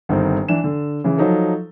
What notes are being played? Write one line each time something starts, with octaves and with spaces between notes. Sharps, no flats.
G1 D#3 C4
E3 D4 E7
D3
C#3 E3
F3 F#3 D#4 A4